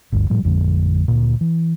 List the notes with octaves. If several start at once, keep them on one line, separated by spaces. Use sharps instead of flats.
G1 D2 G2
A2 F3 G3
A1 F2 D3 G#3
D2 A#2
E3